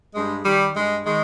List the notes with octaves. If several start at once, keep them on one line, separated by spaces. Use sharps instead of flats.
G2 G#3
D#3 G3
G2 G#3
D#3 G#3